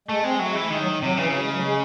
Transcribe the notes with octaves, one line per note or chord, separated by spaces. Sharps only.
G#3 A3
G#3 C4
F#3 A3
G#3
E3 A3
D#3 G#3
F#3
C3 F#3
C#3 E3
F#3
G#3
F#3
A3
G#3